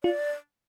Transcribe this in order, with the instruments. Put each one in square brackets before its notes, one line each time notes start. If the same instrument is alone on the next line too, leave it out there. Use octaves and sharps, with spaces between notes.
[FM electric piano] F4 [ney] D5